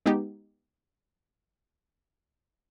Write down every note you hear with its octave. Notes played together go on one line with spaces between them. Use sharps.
G#3 B3 D#4 G4